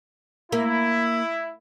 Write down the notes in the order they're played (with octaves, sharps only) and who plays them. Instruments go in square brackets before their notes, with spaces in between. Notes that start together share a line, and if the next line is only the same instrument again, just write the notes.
[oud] A#3 [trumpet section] E4